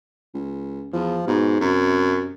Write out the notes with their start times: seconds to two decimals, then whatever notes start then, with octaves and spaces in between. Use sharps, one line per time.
0.34 C#2
0.93 E2 F3
1.27 G#2 B2
1.60 F#2 C3